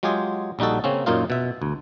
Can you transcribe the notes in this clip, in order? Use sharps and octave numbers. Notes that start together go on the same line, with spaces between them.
F#3 G#3 F4 G4 G#4
A#1 G3 D#4 F#4 A4
C#3 A#3 C4 C#4
F#2 A#2 A#3 D#4 F4 F5
B2 E5
D2